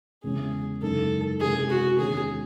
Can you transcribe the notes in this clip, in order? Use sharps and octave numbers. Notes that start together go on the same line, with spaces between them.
E2 C#3 G#3 C#4 G#4
F#2 C#3 E3 G#3 D#4 A4
C3 E3 G#3 C#4 G#4
F#4
E2 D#3 G#3 C#4 G#4